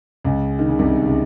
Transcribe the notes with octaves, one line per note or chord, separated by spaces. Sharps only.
C#2 C#3
D#3
C#3
C2 C3
C#3